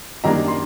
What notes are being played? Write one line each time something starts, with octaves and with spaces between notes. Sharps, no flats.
F#2 D#3 G3 A#3 D4 A#5
C6